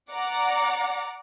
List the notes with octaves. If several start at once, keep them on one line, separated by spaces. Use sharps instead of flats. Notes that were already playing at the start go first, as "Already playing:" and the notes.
D5 F#5 A#5 D6